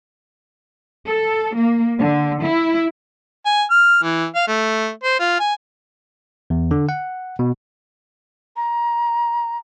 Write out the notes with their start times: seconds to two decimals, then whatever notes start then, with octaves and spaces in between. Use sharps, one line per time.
1.07 A4
1.56 A#3
1.99 D3
2.43 E4
3.45 G#5
3.70 F6
4.03 E3
4.35 F5
4.48 A3
5.04 C5
5.20 F4
5.40 G#5
6.50 E2
6.71 D3
6.89 F#5
7.39 B2
8.56 A#5